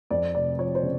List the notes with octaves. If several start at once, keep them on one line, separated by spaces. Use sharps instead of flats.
F2 D5
F1 D5
F3 C#5
C5
C#3